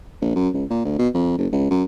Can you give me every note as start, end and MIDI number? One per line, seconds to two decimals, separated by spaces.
0.21 0.35 34
0.36 0.49 42
0.54 0.64 37
0.70 0.84 46
0.85 0.94 38
0.99 1.08 47
1.14 1.33 41
1.38 1.47 30
1.52 1.69 37
1.70 1.83 42